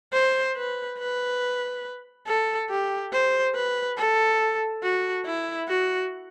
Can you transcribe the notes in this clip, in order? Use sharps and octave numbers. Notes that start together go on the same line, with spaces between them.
C5
B4
B4
A4
G4
C5
B4
A4
F#4
E4
F#4